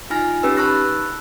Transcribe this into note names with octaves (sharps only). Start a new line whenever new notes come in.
D#4 F4 G#5 F6 A#6
C#4 D#4 G4 B4 E6
A5 B5 C#6 E6 F#6 A#6